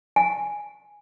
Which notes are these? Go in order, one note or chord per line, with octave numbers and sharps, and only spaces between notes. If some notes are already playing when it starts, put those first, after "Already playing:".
G#5